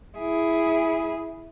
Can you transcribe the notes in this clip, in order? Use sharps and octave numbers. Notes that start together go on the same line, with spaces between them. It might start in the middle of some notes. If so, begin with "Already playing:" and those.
E4 G#4